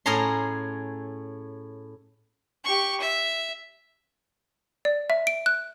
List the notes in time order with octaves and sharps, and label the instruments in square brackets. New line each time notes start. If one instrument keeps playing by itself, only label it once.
[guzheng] A2 C#4 G#4 C#5 A#5 C6
[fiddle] G4 C#6
E5
[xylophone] D5
E5
D7
F#6